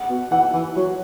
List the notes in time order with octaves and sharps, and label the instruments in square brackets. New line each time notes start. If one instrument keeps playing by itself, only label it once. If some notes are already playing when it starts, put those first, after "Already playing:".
Already playing: [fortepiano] F#5
[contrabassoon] B2
[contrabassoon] E3 [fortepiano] F#5
[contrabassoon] E3
F#3